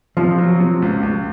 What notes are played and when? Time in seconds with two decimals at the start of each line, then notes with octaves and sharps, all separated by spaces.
0.17 C3 F3
0.38 F#3
0.60 C3
0.82 C#2
1.03 C#2